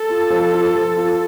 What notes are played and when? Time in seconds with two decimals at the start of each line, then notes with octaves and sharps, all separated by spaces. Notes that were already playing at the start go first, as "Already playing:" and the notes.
Already playing: A4
0.09 F4
0.30 F3
0.52 F4
0.75 F3
0.97 F4